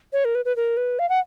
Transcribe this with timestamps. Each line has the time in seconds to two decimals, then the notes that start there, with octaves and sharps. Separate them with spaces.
0.13 C#5
0.25 A#4
0.35 B4
0.45 B4
0.56 A#4
0.77 B4
0.99 F5
1.09 F#5